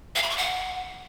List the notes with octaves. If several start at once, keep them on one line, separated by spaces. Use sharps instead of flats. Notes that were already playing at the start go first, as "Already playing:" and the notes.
F5
B5
C#6
F#5